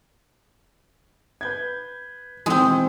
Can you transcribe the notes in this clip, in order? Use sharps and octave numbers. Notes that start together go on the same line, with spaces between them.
B4 G6 G#6
B2 D#3 E3 G#3 C4